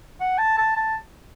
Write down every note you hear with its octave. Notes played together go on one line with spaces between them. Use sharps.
F#5
A5
A5
A5